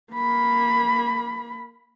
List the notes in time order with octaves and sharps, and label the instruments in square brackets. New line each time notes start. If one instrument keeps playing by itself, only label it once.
[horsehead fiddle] A#3 B5